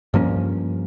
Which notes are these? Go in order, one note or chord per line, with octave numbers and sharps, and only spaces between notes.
G2 F3 A#3 C#4